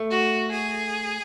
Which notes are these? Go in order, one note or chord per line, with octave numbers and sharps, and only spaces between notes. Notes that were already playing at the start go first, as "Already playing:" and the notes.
Already playing: A3
F#4
G#4